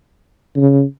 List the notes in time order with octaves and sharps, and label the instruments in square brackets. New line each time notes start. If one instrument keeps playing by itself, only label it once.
[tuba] C#3